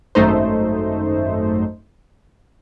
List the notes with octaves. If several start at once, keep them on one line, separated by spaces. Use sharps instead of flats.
G#1 F#2 A3 D#4 C5